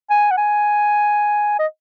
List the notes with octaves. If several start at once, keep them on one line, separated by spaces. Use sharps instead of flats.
G#5
F#5
G#5
D#5